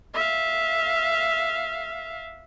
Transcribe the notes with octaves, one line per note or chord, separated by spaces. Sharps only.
E5 F5